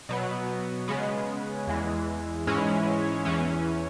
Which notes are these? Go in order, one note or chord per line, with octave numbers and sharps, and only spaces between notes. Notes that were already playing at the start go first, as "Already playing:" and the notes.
B2 F#3 B3
C#3 G#3 B3
E2 E3 G#3
G#2 E3 G#3 C#4 E4
E2 E3 C#4